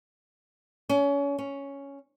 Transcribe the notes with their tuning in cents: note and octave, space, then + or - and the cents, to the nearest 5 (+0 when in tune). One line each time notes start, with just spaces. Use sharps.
C#4 +30
C#4 +5